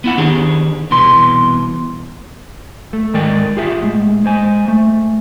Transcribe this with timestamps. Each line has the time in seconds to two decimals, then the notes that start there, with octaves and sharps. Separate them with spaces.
0.04 B3 E4 F#5
0.18 D#3 D4 G4 G#4
0.91 C2 B2 E3 C6
2.93 A3
3.13 G#2 D#3 G#3 A#4 D5 G5
3.57 F4 G4 G#4 E5
3.82 A2 G#3
4.24 G#3 C5 G#5
4.68 A3